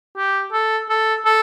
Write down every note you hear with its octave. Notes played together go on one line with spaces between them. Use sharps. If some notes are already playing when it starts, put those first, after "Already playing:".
G4
A4
A4
A4